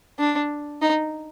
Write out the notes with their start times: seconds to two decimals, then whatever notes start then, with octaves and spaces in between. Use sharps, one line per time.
0.19 D4
0.82 D#4